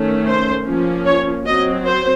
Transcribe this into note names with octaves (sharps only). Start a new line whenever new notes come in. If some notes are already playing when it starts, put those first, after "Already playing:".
Already playing: D#3 A3 C#4
C5
F3 A#3 C#4
C#5
F#3 C4 D#5
C5